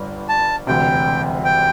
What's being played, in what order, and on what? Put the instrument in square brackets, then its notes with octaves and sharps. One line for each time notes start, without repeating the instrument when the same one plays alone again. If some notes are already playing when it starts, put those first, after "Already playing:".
Already playing: [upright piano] G1 G2
[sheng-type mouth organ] A5
[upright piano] E1 D2 C3 [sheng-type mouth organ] G5
[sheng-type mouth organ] G5